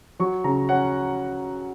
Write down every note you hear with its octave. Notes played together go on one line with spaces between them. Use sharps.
F#3 C#6
C#3 A#5
C#4 F#5